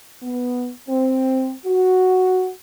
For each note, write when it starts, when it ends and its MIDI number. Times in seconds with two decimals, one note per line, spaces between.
0.23 0.70 59
0.88 1.52 60
1.66 2.49 66